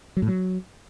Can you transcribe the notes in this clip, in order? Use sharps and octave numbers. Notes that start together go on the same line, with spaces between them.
F#3
A2
F#3